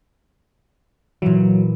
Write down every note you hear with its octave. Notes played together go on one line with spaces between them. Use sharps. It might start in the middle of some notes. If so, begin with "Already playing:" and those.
A#2 E3 F#3